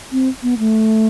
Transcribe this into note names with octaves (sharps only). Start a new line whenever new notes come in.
C4
B3
A3